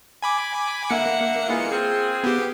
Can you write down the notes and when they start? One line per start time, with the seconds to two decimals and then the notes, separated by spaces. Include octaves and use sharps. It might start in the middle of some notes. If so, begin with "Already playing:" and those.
0.23 G#5 B5 D6
0.90 D3 A#3 E5 F#5 C#7
1.48 E3 G#3 F4
1.71 C4 F4 G#4
2.24 B3 G4